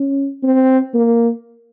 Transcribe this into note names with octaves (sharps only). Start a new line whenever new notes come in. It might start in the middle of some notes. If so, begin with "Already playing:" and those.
Already playing: C#4
C4
A#3